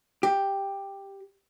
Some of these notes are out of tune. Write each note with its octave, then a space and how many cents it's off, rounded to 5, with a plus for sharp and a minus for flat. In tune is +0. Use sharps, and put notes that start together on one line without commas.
G4 +5